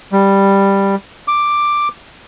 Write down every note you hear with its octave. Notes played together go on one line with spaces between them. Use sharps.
G3
D6